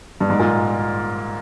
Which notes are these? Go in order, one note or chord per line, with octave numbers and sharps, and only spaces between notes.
G2
G#2
A#2